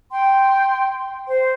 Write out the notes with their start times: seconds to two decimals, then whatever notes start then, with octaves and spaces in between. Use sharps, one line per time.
0.11 G5 C6
1.27 C5